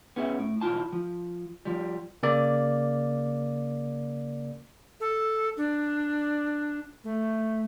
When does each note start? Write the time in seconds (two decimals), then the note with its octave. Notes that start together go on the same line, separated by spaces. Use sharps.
0.16 B3 C#4 G#4 E5
0.39 A2
0.61 B1 E2 G#2 E4 F4 A5
0.92 F3
1.65 F3 G3
2.23 C#3 A#3 D5
5.00 A4
5.57 D4
7.04 A3